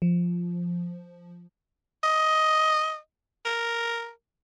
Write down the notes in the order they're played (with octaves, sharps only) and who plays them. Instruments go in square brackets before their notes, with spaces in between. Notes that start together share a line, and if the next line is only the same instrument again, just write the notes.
[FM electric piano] F3
[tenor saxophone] D#5
A#4